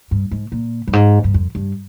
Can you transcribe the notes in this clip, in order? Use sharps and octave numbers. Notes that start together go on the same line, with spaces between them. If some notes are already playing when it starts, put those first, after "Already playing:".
G2
G#2
A#2
G2
G#2
G2
F2
G2